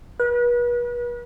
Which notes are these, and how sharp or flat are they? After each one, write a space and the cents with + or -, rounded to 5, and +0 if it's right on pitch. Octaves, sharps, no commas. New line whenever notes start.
B4 -40